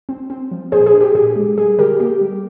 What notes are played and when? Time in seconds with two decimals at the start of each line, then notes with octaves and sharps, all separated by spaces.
0.09 C4
0.30 C4
0.51 F3
0.72 A#2 G#4 C5
0.86 G#4
0.94 D4
1.01 G4
1.15 A#2 G#4
1.36 G#3
1.58 G3 G#4
1.79 D3 G4 A#4
2.00 A#3 G4
2.21 G3